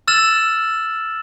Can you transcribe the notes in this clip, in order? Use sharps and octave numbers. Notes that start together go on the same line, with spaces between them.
E6 F6 A6 E7 F#7